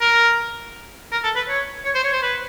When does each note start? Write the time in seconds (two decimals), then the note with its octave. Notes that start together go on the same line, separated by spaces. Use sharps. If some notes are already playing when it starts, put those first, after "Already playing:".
0.01 A#4
1.12 A#4
1.24 A4
1.36 B4
1.48 C#5
1.85 C#5
1.94 C5
2.04 C#5
2.13 C5
2.23 B4